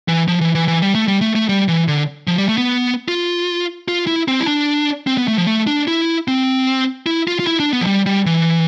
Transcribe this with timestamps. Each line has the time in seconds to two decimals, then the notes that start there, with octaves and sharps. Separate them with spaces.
0.08 E3
0.28 F3
0.41 E3
0.55 E3
0.68 E3
0.82 G3
0.95 A3
1.08 G3
1.21 A3
1.36 A3
1.49 G3
1.68 E3
1.88 D3
2.27 F3
2.38 G3
2.49 A3
2.58 B3
3.08 F4
3.88 F4
4.07 E4
4.28 C4
4.40 E4
4.47 D4
5.07 C4
5.18 B3
5.28 A3
5.38 F3
5.47 A3
5.67 D4
5.88 E4
6.28 C4
7.06 E4
7.28 F4
7.40 F4
7.47 E4
7.60 D4
7.73 B3
7.81 F3
7.86 G3
8.06 G3
8.26 E3